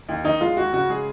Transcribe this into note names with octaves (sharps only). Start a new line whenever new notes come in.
D#2
D#3 D#4
G#3 F4
D#2 F#4
C#3 F#4
G#3 G#4